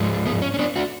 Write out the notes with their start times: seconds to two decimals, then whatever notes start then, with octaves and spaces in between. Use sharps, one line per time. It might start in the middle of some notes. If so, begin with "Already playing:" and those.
Already playing: G#2 F3 G#3
0.26 B3
0.42 C#4
0.54 C#4
0.59 B3 D4
0.76 D4 F#4